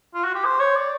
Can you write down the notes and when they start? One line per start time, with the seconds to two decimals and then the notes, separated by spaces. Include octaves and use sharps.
0.14 F4
0.24 F#4
0.35 G4
0.45 C5
0.60 C#5
0.76 D5